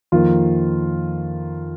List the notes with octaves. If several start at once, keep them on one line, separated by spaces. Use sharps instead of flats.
F2 D#3 A#3 F4